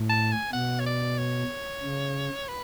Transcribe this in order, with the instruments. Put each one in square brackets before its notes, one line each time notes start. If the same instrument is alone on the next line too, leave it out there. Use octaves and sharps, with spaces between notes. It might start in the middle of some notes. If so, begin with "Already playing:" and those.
Already playing: [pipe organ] A2
[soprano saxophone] A5
G#5
[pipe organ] B2 [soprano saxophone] F#5
[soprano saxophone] C#5
D5
C#5
[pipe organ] C#3
[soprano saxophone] B4